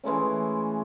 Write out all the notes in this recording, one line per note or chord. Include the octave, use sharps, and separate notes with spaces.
E3 G#3 A3 C#4